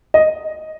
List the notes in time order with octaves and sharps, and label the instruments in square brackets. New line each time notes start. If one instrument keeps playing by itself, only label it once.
[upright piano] D#5